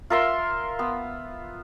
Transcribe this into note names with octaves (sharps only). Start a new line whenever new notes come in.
F4 A#4 E5 C6
B3